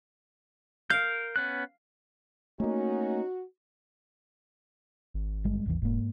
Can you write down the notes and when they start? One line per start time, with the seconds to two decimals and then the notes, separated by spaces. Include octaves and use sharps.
0.90 A#4 F5 G6
1.36 B3 C#4 F#6
2.60 A3 A#3 C#4 D#4 F#4
5.14 G#1
5.44 G1 G3 G#3
5.66 G#1 D#2 E3
5.82 E1 G#2 A#3